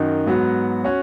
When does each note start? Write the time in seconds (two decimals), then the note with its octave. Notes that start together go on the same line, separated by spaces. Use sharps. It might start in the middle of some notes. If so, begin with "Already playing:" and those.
Already playing: F#2 D#3 D#4 F#4
0.27 G#2 F#3 B3 F#4
0.84 C#4 F#4 C#5